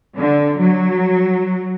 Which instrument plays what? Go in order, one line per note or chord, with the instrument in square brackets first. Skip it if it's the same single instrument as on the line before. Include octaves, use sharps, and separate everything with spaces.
[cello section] D3
F#3